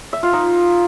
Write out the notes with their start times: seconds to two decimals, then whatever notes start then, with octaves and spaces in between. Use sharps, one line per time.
0.13 E5
0.23 F4
0.33 D#4